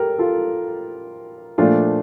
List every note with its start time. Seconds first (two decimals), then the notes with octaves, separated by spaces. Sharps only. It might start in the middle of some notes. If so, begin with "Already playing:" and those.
Already playing: G4 A4 A#4
0.19 F4 A4
1.58 A#2 F3 A3 D4 F4